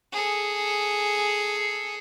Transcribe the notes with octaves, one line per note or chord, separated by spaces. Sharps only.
G#4 A4